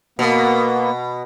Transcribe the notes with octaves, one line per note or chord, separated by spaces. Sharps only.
B2 A#3 B3